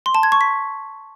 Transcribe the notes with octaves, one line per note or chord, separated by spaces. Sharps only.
C6
A5
G#6
C#6
B6